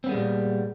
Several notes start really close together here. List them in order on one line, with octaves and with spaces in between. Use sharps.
C4 B3 G#3 G3 A#2